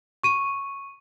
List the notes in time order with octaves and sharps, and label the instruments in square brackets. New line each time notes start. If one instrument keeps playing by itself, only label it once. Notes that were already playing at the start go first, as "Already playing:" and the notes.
[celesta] C#6 D#7